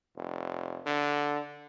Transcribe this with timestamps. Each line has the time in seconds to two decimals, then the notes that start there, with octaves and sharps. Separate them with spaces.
0.17 F1
0.87 D3